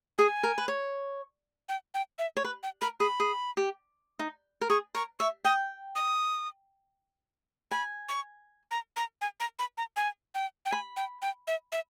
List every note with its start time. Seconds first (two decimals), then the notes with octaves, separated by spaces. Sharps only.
0.18 G#4 G#5
0.43 A#4
0.58 B4
0.68 C#5
1.69 G5
1.94 G5
2.19 E5
2.37 C#5
2.44 B4
2.63 G5
2.81 A#4 B5
3.00 G#4 B5
3.20 G#4
3.57 G4
4.19 D#4
4.61 A#4
4.70 G#4 C#6
4.95 A#4 C#6
5.20 E5 C#6
5.45 G5 D#6
5.95 D#6
7.71 G#5 B5
8.09 C#6
8.71 A#5
8.96 A#5
9.21 G#5
9.40 A#5
9.59 B5
9.78 A#5
9.96 G#5
10.35 G5
10.65 G5
10.71 G#5 B5
10.96 G5
11.22 G5
11.47 E5
11.72 E5